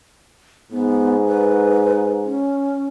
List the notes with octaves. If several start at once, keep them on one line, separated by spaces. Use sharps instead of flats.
G#2 B3
B4
C#4